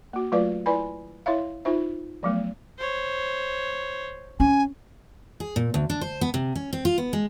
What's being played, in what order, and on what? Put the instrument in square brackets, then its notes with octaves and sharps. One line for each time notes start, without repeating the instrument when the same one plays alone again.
[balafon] A#3 F#4
F#3 A3 F4 B4 D5 F5
E4 B4 D5 G#5 B5
E4 C#5 E5 F5
D#4 F4 C5 E5
F3 F#3 A3 B3
[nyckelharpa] C5 C#5
[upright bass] C#4 [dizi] G#5
[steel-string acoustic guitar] G#4
A#2
D2
D4
C5
B3
C3
C#4
C4
F4
B3
G#3